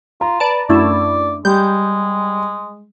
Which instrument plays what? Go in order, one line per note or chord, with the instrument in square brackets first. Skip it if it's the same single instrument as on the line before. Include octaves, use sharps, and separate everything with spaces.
[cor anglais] F4 [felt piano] A#5
[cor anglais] B4 [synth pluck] D5 A5
[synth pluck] F#2 A3 E4 [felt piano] D4 [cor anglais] D5
[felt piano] G3 [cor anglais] G#3 [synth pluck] G6